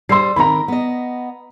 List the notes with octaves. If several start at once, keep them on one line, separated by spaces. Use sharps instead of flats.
G3 C5 C6 E6 C7
D#3 C4 A#4 A#5 B5
B3 D#5